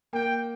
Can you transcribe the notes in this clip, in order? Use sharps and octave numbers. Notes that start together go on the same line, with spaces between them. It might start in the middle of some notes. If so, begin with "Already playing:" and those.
A#3 G5